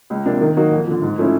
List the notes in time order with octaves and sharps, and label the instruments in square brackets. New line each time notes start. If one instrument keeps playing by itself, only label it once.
[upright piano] C#2
C3 F3 A#3 D4
D#3
F#3 A#3 D#4 F#4
F2
D3 F3
G#2
F3 A3 C#4 E4